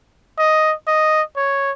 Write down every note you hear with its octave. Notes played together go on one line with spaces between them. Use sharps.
D#5
D#5
C#5